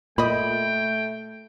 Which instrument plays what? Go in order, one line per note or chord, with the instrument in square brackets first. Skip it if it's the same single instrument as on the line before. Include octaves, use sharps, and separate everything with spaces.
[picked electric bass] A#2 [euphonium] A3 [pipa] D#5 B5 [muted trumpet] G5